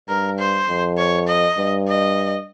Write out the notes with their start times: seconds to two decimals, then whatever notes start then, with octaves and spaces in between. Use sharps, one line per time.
0.08 G2 A#4
0.38 C5
0.68 F2
0.98 C#5
1.27 D#5
1.57 G2
1.88 D#5